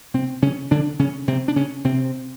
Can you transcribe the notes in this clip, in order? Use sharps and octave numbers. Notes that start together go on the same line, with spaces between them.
C3 C4
C#3 C#4
D3 D4
C#3 C#4
C3 C4
D4
C#3 C#4
C3 C4